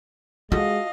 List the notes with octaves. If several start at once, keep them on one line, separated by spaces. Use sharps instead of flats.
G#3 F4 F#4 A4 D#5 F5